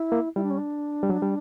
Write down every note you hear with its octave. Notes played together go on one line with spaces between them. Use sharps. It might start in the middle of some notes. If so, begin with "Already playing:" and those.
Already playing: E4
A#3
G3 E4
D4
C#4
D4
G3
F#3
G3